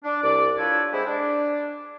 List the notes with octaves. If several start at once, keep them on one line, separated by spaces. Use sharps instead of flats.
D4
C2 D5
D4 F4 A4 B4 C#5
G#3 C4 E4
D4